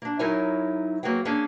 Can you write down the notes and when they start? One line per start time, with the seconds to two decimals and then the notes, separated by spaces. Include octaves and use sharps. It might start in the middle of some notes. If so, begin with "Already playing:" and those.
0.02 A#3 D4
0.19 F#3 D#4 E4 A#4 C#5 G#5
1.03 F#3 A#3 B3 F#4 G#4 G5
1.25 A#3 C#4 D4 G#4